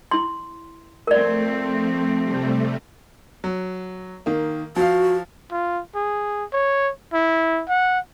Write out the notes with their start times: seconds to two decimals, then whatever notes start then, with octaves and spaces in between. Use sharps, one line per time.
0.11 E4 C6
1.07 F3 A3 C4 A#4 D5
2.23 C3 G3 A3
3.44 F#3
4.26 D#3 A#3
4.76 F3 F#4 F5
5.51 F4
5.95 G#4
6.53 C#5
7.13 E4
7.69 F#5